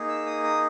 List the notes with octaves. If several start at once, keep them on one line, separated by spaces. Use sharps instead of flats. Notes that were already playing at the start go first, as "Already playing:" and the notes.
Already playing: A#3 D#4 G#4
E6
D#6
D#6